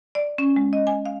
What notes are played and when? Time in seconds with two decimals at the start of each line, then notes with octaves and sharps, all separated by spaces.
0.15 D5
0.38 C#4
0.56 G#3
0.73 D#5
0.87 G#5
1.06 F5